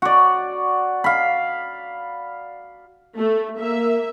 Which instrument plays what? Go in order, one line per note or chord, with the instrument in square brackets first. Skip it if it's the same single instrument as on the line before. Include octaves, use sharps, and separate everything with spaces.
[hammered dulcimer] F#4 D5
F5 B5
[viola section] A3
A#3 E5